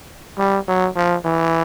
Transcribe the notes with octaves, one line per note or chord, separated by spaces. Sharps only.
G3
F#3
F3
E3